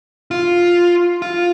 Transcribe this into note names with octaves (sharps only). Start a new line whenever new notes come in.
F4
F4